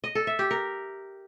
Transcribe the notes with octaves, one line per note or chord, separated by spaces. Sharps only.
D#5
A4
E5
G4
A#4